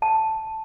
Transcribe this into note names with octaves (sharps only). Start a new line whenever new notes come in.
A5